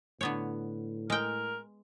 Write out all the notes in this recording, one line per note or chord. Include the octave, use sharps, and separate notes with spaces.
A2 D3 B3 C#5
G#3 A#4 G5